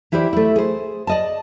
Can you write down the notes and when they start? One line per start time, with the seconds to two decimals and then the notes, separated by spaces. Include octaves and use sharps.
0.12 E3 E4 G4 C5 D5
0.33 A3 E4
0.56 G#4 C5
1.07 D5 D#5 A5